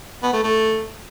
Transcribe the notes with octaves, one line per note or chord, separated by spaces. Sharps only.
B3
A3
A3